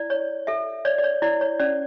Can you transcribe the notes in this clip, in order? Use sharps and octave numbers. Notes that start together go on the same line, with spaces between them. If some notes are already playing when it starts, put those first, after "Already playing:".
Already playing: E4 D5
C#5
A4 E5
C#5 D5
D5
C#5
E4 D5
C#5
C#4 D5